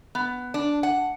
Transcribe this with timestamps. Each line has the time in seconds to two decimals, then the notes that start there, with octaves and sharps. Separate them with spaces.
0.15 B3
0.54 D4
0.83 F#5